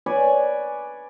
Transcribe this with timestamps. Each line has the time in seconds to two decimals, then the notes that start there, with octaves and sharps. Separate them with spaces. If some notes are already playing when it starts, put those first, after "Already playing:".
0.06 B4 C#5 D5 G#5